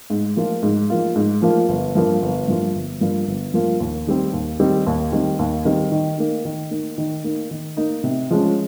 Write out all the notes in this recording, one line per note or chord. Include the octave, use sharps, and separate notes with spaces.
G#2
F3 A#3 F4
G#2
F3 A#3 F4
G#2
F3 A#3 F4
G1
G2 F3 A#3 F4
G1
G2 F3 A#3 F4
G1
G2 F3 A#3 F4
G1
G2 F3 A#3 F4
D#2
D#3 G3 C4
D#2
D#3 G3 C4
D#2
D#3 G3 C4
D#2
D#3 G3 C4
D#3
A#3 D#4
D#3
A#3 D#4
D#3
A#3 D#4
D#3
A#3 D#4
C3
F3 G#3 C#4